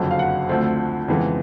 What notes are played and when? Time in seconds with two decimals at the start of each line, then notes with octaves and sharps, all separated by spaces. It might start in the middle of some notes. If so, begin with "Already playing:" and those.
Already playing: F#1 F2 D3 F#3
0.11 F5
0.19 F#5
0.49 D2 D3 F3 A3 C4
1.08 F2 C#3 E3 G#3 B3